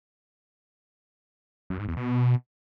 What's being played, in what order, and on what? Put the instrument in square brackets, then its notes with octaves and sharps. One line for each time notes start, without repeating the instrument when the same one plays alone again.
[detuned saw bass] F#2
G#2
E2
B2